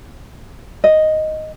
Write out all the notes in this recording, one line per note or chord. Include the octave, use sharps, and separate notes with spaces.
D#5